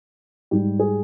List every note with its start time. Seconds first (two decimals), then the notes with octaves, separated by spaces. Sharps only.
0.51 G#2 G3 G4
0.79 G#4